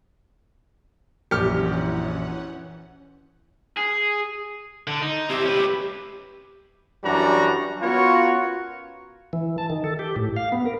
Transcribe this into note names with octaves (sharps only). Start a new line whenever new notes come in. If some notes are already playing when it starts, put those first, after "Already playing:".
A#1 F#2 E3 C#4 G4 F#5 F6 C#7
G#4
D3
D#4
C4 E4 G4
C#4 B4
F#2 E3 G3 D4 F#4 A#5
B3 C#4 F4 F#4 A#4 C#5
E3
A5
D#3
A4
G4
A2
F5
B3
A#4